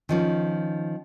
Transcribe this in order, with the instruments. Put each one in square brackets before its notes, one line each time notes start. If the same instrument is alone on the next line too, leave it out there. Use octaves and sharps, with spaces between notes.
[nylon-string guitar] D#3 F3 C#4